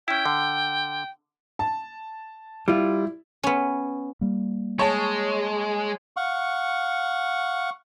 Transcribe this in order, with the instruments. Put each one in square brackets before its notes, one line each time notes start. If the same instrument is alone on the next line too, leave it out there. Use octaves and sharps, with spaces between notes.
[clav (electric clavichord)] C#4 E4 [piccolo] G5
[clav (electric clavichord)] D3
[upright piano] A5
[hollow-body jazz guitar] G3 F4 [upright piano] E4
[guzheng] B3 C#4
[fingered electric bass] G3 A#3
[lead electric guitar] G#3 [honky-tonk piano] C#5 A5
[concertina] F5 F#5 C#6